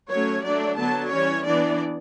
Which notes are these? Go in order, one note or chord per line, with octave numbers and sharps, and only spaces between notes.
F#3 A3 C#4 C#5
F#3 A3 D4 D5
D3 F#3 B3 A5
E3 G3 C#4 C#5
E3 B3 D4 D5